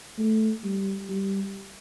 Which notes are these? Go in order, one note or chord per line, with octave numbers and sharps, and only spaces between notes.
A3
G3
G3